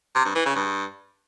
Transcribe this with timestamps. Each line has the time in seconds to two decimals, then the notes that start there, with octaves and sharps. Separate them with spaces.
0.15 C3
0.25 G2
0.35 E3
0.46 C#3
0.56 G2